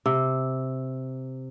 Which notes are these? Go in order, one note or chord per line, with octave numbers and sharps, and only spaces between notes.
C3